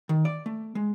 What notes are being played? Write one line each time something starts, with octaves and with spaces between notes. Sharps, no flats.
D#3
D5
A3
G#3